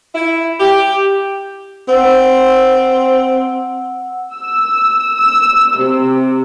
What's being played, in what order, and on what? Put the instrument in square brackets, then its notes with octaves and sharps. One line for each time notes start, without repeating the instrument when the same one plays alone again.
[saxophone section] E4
G4
[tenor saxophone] C4 [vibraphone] F#5 E6
[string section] E6
E6
C3